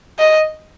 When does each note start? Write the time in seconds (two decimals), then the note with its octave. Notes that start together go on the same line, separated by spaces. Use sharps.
0.19 D#5